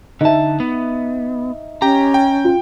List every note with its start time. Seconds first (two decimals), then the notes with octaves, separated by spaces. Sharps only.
0.21 D3 D#4 E5 A5
0.60 B3
1.82 C#4 G4 G5 A#5
2.14 G5
2.44 F4